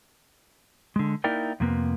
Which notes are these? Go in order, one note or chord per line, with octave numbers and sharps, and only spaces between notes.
D3 G#3
A#3 D#4 E4 A#4 D5 G5
F2 C3 A#3 B3